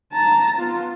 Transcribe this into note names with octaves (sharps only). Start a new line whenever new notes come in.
A5 A#5
B3 F4